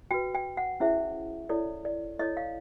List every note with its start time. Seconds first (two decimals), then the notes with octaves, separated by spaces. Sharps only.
0.11 F#4 B4 G5
0.35 G5
0.57 F#5
0.80 C#4 E4 G#4 C5 E5
1.49 E4 A4 C#5 D5
1.85 D5
2.19 E4 A4 C#5 D#5
2.37 F5